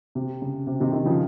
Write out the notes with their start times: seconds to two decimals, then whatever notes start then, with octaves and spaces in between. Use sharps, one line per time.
0.15 C3
0.42 C#3
0.67 C3
0.80 C3 D#3
0.92 C3 D#3
1.05 C#3 F3